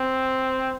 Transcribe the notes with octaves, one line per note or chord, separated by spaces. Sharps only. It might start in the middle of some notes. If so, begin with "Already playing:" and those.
Already playing: C4